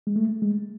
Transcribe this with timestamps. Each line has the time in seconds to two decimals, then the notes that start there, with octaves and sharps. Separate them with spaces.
0.07 G#3
0.16 A3
0.42 G#3